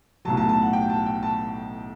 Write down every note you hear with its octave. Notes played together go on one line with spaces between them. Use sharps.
B1 A2 F#3 A5
A5
A5
F#5
G5
A5
G5
A5